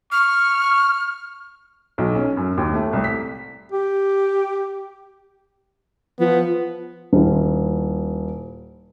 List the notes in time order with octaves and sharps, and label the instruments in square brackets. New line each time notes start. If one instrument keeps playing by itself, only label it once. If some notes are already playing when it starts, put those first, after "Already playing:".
[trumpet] C#6 [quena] F6
[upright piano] B1
C#4
F#2
D#2
A3
C2
B6
[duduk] G4
[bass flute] F3 [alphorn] B3
[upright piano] D#1 E4